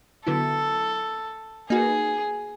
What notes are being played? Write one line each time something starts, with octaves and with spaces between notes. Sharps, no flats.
D3 F#3 B3 E4 A4
A#3 D#4 F#4 G#4 B4